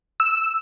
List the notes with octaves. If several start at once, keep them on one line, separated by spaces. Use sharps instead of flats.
E6